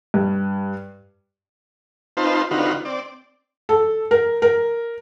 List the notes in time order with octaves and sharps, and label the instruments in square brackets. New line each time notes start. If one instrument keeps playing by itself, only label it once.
[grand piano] G2
[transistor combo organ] C4 D#4 F4 B4 C5 A5
D3 C4 D#4 F4 F#4 B4
C4 D5
[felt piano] A4
A#4
A#4